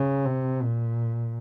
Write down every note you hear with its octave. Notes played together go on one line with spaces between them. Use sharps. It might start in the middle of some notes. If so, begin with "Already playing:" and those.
Already playing: C#3
C3
A#2